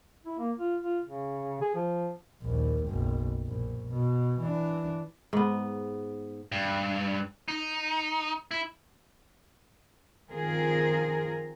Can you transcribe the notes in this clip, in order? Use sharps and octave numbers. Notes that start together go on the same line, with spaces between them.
E4
A#3
F4
F4
C#3
G#4
F3
A#1 D#2
F#1 B1
A#1
B2
E3 D4
G#2 B3
G2
D#4
E4
D#3 F3 C4 F4 G#4 A#4